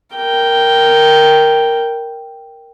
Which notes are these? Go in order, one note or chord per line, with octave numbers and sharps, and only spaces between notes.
A#4 G5